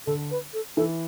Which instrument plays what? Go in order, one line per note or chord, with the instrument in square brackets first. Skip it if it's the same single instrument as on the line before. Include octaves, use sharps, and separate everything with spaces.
[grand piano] D3 [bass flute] A4
[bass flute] B4
A4
[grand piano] E3 [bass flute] A4